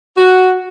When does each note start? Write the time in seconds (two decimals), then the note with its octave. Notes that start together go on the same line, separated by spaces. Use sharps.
0.17 F#4